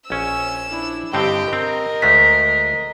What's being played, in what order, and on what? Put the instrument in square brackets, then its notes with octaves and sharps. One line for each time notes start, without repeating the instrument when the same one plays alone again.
[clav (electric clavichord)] A#1 C#4 [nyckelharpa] G#5 [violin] E6
[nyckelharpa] D4 E4
[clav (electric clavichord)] G2 D3 C4 [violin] G4 G5 [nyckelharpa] D#5
[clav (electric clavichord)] C4 [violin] A#4
[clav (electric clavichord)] D2 G#3 A3 [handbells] B6